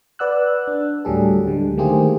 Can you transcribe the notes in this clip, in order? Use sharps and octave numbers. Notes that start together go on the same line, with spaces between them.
B4 D5 F#5 E6 F#6
D4
D2 A2 F#3 G3 G#4 A4
D3 G3 G#3
D#3 A3 A#3 G4 G#4 C5